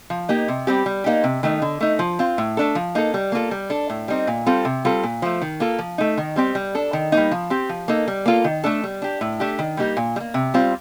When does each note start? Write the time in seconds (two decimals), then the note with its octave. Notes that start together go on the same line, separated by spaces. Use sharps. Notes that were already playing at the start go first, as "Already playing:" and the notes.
0.10 F3
0.29 A#3 D#4 G4
0.48 C3
0.67 G3 C4 G4
0.86 G3
1.04 A#3 D#4 G4
1.24 C3
1.43 D#3 A3 D#4
1.62 D3
1.81 A3 D#4
1.99 F3
2.19 C4 F4
2.38 A2
2.57 A3 D4 A4
2.75 F3
2.95 A#3 D#4 A4
3.14 G3
3.32 A#3 F4 A4
3.51 G3
3.70 D4 A4
3.90 A2
4.08 G3 C4 D#4
4.27 A#2
4.46 G3 C4 F4 A4
4.65 C3
4.85 G3 C4 F4 A4
5.03 A#2
5.22 F3 A3
5.42 D#3
5.60 A#3 F4 A4
5.79 F3
5.98 A3 D#4
6.17 D#3
6.36 G3 C4 G4
6.55 G3
6.75 D4 A4
6.93 D#3
7.12 G3 A#3 D#4
7.31 F3
7.50 C4 G4
7.69 F3
7.88 A#3 D#4 A4
8.08 G3
8.26 A#3 F4 A4
8.44 D#3
8.64 A3 D4 A4
8.84 G3
9.02 D4 G4
9.21 A2
9.40 A3 D4 G4
9.59 D#3
9.77 G3 A#3 D#4 G4
9.97 A#2
10.16 G3
10.20 A#3
10.34 C3
10.54 G3 C4 F4